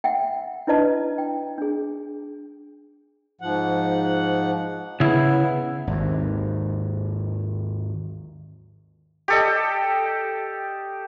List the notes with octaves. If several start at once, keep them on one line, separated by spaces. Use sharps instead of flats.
E5 F#5 G5
D4 E4 B4 D#5 A5
G5
D4 G#4
G#2 F3 F#5
C#3 B3 E4
G#1 D#2
G4 A4 D#5